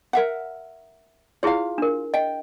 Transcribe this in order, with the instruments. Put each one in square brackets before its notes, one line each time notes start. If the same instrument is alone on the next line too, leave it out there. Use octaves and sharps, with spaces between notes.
[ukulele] A#4 E5 F#5
[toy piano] E4 G#4 C#5 [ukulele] F4 F5
[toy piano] D4 A#4
[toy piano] D#5 [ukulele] G5